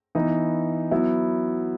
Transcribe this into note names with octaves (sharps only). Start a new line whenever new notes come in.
E3 B3 D#4
F#3 B3 E4